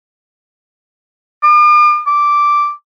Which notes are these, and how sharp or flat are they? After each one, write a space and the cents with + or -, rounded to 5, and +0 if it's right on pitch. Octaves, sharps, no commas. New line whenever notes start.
D6 +45
D6 -5